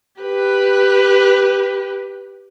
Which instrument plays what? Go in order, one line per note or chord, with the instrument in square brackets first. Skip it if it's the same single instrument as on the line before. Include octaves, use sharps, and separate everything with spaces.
[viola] G4 B4